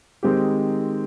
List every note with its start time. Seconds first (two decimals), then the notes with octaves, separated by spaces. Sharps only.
0.23 D#3 G#3 C4 D#4 G4